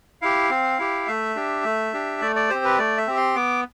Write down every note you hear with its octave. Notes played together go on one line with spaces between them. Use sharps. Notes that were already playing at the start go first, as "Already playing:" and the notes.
E4 G4 F5
C4
E4 G4
A3 E5
D4 G4
A3
D4 G4
A3 D5
D5
C4 G4 C5
B4
A3 D5
E5
C4 G4
C6
B3 D6